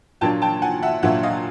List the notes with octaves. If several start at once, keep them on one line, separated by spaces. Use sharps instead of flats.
A#2 F#3 A#3 D4 G5 A5
G5 A5
F#5 G#5
E5 F#5
A#2 F#3 A#3 D4 E5 F#5
D#5 F5